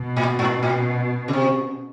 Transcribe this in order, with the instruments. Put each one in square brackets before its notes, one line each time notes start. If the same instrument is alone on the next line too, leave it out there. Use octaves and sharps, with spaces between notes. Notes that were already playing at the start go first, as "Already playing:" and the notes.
Already playing: [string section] B2
[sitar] A2
G#2
A2
C#3
C3